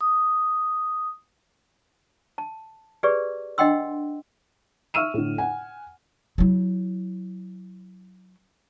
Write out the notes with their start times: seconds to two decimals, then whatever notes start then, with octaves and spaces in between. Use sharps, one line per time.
0.01 D#6
2.38 A5
3.03 G4 G#4 B4 D5
3.58 D4 D#5 F#5 G5 C6 E6
4.94 E5 C#6 E6 F6 D#7 E7
5.14 A2 D3
5.38 F#5 G#5
6.38 F#3 E4